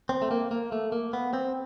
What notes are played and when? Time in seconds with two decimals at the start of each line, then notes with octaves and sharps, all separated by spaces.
0.09 C4
0.22 A3
0.31 A#3
0.51 A#3
0.72 A3
0.92 A#3
1.13 B3
1.33 C4